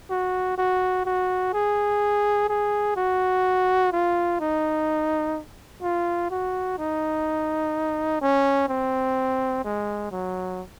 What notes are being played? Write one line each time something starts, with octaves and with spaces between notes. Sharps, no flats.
F#4
F#4
F#4
G#4
G#4
F#4
F4
D#4
F4
F#4
D#4
C#4
C4
G#3
F#3